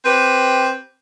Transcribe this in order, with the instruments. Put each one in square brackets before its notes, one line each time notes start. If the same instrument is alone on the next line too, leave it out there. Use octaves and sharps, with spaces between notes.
[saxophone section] C4 G4 B4